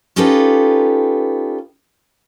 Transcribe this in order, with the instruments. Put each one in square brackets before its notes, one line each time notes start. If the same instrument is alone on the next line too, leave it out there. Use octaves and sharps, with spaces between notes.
[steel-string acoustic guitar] C#4 D#4 F4 G4 A4 B4